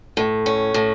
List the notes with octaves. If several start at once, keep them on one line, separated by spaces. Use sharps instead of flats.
A2
C#4
A2